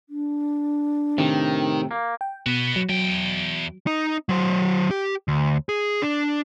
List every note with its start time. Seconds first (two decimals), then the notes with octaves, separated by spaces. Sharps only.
0.09 D4
1.18 A2 C3 D#3
1.91 A#3
2.21 G5
2.46 B2 F#4 B4
2.76 F#3
2.89 E2 F#3 G5
3.87 D#4
4.29 F#3 C5
4.91 G4
5.28 D2
5.69 G#4
6.02 D4